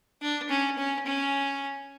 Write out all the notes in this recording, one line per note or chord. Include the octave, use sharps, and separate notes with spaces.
D4
C#4
C#4
C#4